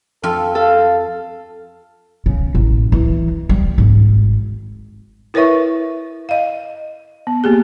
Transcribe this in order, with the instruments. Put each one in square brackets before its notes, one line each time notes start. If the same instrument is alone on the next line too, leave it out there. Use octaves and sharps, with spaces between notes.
[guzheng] F2 F4 [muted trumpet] A4
[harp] A4 [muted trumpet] F5
[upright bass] C#3
A1
E3
G3
G#1
[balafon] E4 A#4 B4 C#5 E5 C#6
D#5 F5
B3
A#3 G4 G#4